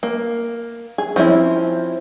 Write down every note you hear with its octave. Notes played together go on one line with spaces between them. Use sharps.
A#3
G#4
F3 C4 C#4 E4